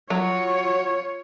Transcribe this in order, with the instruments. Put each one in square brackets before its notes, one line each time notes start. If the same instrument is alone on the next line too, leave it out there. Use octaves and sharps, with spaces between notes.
[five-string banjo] F#3 [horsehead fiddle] F4 C#5